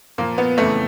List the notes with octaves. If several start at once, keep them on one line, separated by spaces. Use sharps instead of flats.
A#2 F3 A#3
B3
F2 C#3 E3 A3